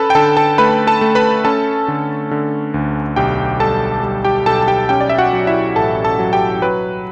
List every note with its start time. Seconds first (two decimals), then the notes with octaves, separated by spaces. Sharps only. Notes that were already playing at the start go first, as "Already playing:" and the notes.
Already playing: C#4 A4 B4 A5 B5
0.10 G5
0.15 D3 A4 A5
0.37 A4 A5
0.58 A3 B4 B5
0.87 A4 A5
1.01 A3
1.15 B4 B5
1.45 C#4 A4 A5
1.88 D3
2.31 D3
2.74 D2
3.16 B1 G4 G5
3.60 G3 A4 A5
4.03 G3
4.25 G4 G5
4.46 B1 A4 A5
4.62 A5
4.67 G4 G5
4.89 C#4 G4 G5
5.01 D5
5.09 E5
5.18 F#4 F#5
5.33 F#3
5.47 E4 E5
5.76 A1 A4 A5
6.05 A4 A5
6.19 F#3
6.33 G4 G5
6.62 F#3 B4